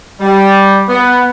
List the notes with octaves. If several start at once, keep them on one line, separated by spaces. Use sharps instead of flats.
G3
B3